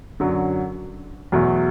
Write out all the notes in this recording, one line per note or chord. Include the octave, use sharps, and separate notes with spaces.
F#2 D3 F#3
E2 B2 F#3 A3